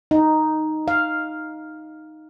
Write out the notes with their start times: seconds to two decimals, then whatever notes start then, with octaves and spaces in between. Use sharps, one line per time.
0.11 D#4
0.88 F5